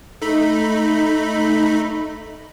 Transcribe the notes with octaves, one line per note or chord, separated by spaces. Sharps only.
A3 D#4 B5